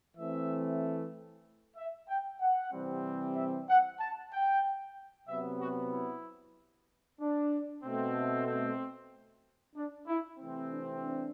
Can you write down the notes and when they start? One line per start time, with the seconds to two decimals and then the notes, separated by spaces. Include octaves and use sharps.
0.16 E3 A3 C4 E5
1.76 E5
2.08 G5
2.40 F#5
2.71 C3 E3 G3 C4
3.35 E5
3.68 F#5
3.99 A5
4.32 G5
5.28 C3 F#3 B3 E5
5.59 F#4
5.91 E4
7.19 D4
7.83 B2 A3 C4
8.47 C4
9.75 D4
10.07 E4
10.38 C3 E3 A3 C4
10.71 D4
11.02 D4